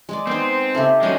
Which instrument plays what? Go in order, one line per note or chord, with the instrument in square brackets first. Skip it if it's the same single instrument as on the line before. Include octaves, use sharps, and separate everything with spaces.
[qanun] G#3 G#4 D5
[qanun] B3 D#4 [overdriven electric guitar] C4
[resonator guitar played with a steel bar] C#3 E5 A5 [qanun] G4 A4
[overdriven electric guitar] F#3 G#3 [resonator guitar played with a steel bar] B3 C5 [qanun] C#4 B5